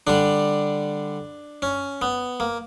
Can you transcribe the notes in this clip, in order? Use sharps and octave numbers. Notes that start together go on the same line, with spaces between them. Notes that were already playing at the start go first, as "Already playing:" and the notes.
D3 G3 D4
C#4
B3
A#3